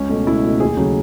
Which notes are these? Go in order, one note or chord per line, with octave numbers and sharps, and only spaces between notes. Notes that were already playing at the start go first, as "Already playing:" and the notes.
Already playing: C#2 C#4
B2 A3
C#2 E4
B2 A3
D#2 G#4
C#3 F#3 A3